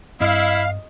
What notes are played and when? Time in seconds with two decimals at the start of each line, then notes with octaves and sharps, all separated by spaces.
0.20 G2 C4 E4 D#5 F5